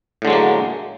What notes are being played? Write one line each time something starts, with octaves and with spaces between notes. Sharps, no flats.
A2 D3 F#3 G#3 A#3